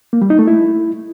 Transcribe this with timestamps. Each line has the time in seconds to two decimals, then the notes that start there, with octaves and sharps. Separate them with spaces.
0.13 A#3
0.22 G3
0.30 D#4
0.39 A3
0.47 E4